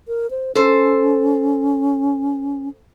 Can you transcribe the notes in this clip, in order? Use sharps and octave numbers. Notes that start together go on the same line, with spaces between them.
A#4
C5
C#4 A4 C5